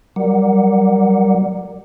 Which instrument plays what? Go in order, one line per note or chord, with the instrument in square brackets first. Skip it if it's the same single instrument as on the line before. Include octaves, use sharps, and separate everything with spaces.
[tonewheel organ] F#3 G3 A#4 D5 F#5